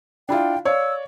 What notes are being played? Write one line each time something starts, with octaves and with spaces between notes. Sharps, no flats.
D4 E4 F4 G5
C#5 D5 F5 E6